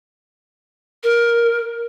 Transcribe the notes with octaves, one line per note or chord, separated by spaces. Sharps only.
A#4